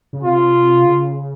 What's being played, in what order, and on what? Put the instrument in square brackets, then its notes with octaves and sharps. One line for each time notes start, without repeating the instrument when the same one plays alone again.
[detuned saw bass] C#3
[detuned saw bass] C3 [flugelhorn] F4
[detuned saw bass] C#3